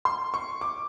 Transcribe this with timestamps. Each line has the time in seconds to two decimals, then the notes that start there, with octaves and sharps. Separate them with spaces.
0.05 C6
0.34 C#6
0.61 D6